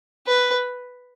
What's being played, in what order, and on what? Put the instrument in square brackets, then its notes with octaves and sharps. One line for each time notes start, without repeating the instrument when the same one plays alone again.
[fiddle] B4